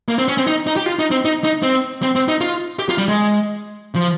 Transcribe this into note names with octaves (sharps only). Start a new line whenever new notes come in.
A#3
C4
C#4
C4
D#4
D#4
G4
F4
D#4
C4
D#4
D#4
C4
C4
C4
D#4
F4
G4
F4
G3
G#3
F3